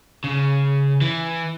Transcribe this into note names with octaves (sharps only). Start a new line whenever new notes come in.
C#3
E3